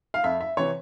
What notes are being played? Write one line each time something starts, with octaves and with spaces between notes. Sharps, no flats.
F5
F2 E5
E5
C3 E3 C#5